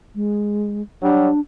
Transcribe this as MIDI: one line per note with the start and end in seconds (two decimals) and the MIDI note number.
0.15 0.82 56
1.02 1.30 54
1.02 1.30 55
1.02 1.40 62